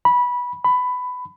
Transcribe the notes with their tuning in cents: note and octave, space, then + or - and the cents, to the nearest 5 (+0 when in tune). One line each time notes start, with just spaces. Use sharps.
B5 -15
B5 +15